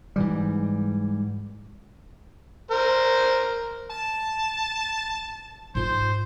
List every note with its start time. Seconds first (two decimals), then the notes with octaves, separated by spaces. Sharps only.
0.16 G#2 E3 G3
2.71 A#4 C5
3.90 A5
5.75 G#2 F4 C5